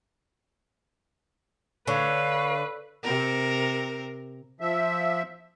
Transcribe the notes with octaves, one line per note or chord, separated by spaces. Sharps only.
D3 B4 C#5 F5
C3 C4 A#4
F3 E5